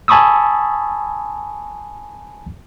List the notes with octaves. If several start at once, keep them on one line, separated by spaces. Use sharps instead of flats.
G#5 A5 B5 C#6 D#6 E6